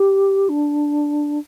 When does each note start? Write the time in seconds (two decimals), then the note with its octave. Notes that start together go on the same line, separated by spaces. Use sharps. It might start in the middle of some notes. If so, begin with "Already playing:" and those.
Already playing: G4
0.49 D4